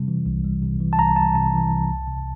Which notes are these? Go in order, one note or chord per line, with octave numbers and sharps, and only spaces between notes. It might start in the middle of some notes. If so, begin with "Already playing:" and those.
Already playing: C3 G3
E3
C2
G3
C3
E3
A5
C2 A#5
G3 A5
C3 A5
E3
C2
C2
C3